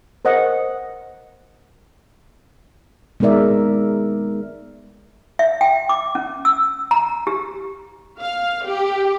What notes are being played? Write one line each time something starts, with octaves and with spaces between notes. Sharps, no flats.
A#4 C5 D#5 F#5
G#3 B3 D#4 A#4 D5 E5
E5
G5
D6
C#4
E6
A#5
G4
F5
G4